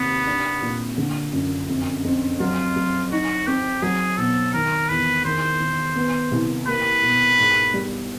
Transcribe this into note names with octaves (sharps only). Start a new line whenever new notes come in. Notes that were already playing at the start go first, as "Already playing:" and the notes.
Already playing: D#2 C3 B3
D4
A#2
D3
F#2
F2
F2
F#3 F4
F#3
D#4 F#4
C4 G4
F#3 G#4
B2 A4
D#3 A#4
E2 B4
D#3 C5
D#3
B3
C2
A#3 B4
B2
G#2
G3